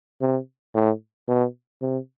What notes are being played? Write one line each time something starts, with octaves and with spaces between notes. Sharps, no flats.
C3
A2
B2
C3